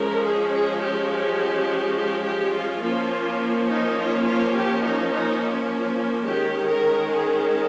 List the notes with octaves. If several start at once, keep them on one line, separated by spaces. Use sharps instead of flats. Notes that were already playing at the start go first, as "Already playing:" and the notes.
Already playing: F3 G#3 C#4 A#4
G#4
G#4
G4
G4
G4
G4
F4
F3 A#3 C#4
D#4
F4
F4
G4
D#4
D#4
D#3 G#3 C#4 G4
A#4
G#4